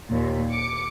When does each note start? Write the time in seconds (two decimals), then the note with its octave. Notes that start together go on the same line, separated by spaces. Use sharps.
0.10 D#2 A#2
0.52 D6 C#7